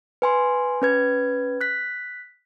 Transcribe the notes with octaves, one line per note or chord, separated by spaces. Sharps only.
B4 G#5 C6
C#4 B4 G#6
F#6 B6